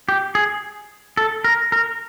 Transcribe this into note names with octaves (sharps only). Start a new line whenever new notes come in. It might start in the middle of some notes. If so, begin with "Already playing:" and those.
G4
G#4
A4
A#4
A#4